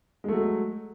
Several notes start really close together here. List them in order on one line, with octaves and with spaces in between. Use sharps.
G#3 A3 F#3